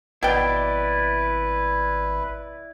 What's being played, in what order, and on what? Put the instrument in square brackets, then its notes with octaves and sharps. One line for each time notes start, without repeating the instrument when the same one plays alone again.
[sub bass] G#1 [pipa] B2 G5 [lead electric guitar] E4 D5 [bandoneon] B4